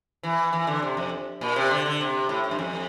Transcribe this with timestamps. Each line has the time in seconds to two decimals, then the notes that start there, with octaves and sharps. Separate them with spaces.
0.23 E3
0.53 E3
0.67 D3
0.82 C3
0.97 F2
1.41 A#2
1.56 C3
1.71 D3
1.86 D3
2.01 C3
2.29 A2
2.44 A2
2.51 G2
2.59 F2